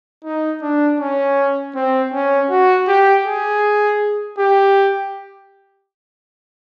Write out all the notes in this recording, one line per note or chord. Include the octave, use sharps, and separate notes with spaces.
D#4
D4
C#4
C4
C#4
F#4
G4
G#4
G4